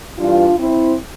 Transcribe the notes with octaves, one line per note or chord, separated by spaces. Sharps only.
G2 E3 G3 D4 F4
C4 E4